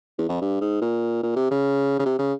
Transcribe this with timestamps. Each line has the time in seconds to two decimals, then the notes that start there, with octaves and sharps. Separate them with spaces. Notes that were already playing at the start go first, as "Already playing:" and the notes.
0.19 E2
0.29 F2
0.41 G2
0.61 G#2
0.81 A#2
1.23 A#2
1.36 C3
1.51 C#3
1.99 C#3
2.06 C3
2.19 C#3